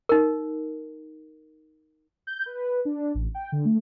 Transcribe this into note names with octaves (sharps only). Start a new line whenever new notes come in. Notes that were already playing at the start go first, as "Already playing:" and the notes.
D#4 A#4
G6
B4
D4
A1
G5
D3
A3